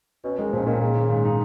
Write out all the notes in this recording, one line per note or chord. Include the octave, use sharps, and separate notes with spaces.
B2 C#4
D#3 G#3
A#2 F3
A#2 D#3
C#3 A#3
D#3
G#2
D#4